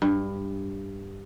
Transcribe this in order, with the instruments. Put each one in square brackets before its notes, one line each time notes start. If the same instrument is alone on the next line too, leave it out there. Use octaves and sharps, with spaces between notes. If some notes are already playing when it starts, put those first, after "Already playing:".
[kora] G2